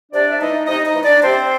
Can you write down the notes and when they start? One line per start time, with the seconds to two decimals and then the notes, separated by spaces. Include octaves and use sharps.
0.12 C3 D4 D5
0.29 E5
0.39 E3 A3 D#4 D#5
0.67 C3 D#4 D#5
0.86 D#4 D#5
0.95 E3 A3
1.04 D4 D5
1.22 C3 C4 C5